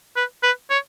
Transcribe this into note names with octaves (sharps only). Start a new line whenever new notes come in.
B4
B4
C#5